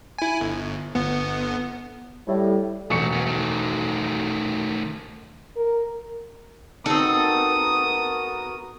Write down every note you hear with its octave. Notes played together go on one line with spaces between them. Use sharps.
E4 G#5
G1
G1 B3
A2 G3
E1 F2 A3 C#6 C#7
A#3 B3
D#3 A3
A#4
B3 C4 D#4 F#4 A4 A#4 D#6